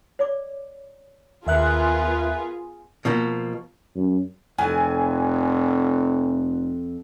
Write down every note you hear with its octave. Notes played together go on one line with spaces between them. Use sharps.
C#5 D5 D6
D#2 B3 F4 G#4 A#4 B4 E5 F#6
B2 F3 A#3
F#2
F1 F2 G#5